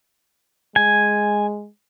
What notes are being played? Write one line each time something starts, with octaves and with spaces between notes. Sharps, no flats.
G#3 G#5